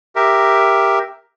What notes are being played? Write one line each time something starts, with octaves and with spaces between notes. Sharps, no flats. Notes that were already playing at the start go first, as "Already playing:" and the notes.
G4 A#4 E5